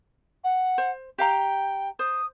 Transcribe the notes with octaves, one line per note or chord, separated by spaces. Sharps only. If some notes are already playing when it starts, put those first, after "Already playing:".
F#5
C5
G4 F5 G5 A#5
C5 D#6